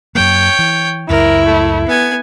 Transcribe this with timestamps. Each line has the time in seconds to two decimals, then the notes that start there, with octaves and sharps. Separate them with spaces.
0.15 F#2 F#3 A#3 C#5 G5
0.59 E3
1.09 C#2 F#2 E4 A#4
1.46 A3
1.87 B3 G#5